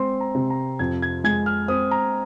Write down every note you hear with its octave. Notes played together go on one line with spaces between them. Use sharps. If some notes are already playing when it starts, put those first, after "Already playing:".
Already playing: G#3 C4 C6
A#5
C3
A#5
F2 G#6
G#6
G#3 G#6
F6
C4 D#6
A#5